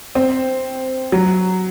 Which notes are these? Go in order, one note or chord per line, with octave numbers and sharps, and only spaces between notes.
C4
F#3